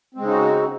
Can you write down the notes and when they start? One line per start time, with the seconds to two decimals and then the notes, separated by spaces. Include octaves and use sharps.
0.14 C4
0.18 G#3
0.21 C#3
0.25 D#4
0.29 F#4